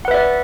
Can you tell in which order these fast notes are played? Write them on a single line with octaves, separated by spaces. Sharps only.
F#5 B4 E5 D5